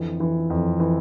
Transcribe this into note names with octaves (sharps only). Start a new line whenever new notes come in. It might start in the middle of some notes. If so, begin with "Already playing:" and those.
Already playing: F2 D3 E3
E3
F2
E3